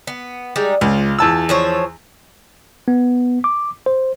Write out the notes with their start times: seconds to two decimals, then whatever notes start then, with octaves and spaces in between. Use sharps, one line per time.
0.07 B3
0.56 G3 G#3 D#4
0.81 C#2 F4
1.19 E2 A5 E6
1.49 F3 C5 C#5
2.88 B3
3.44 D6
3.86 C5